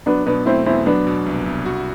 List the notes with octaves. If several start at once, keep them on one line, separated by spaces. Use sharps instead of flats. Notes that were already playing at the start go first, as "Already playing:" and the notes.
F#3 B3 D4
B2 B3 D4
A3 C4 E4
E2 C4 E4
F#3 B3 D4
B2
C2
C2
F#4